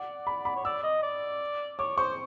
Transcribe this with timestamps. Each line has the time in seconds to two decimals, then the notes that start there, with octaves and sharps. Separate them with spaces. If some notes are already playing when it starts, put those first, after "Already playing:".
Already playing: D5 F#5
0.27 B5
0.45 B5
0.56 C#5
0.65 D5 E6
0.83 D#5
1.03 D5
1.79 C#5 D6
1.98 C5 C#6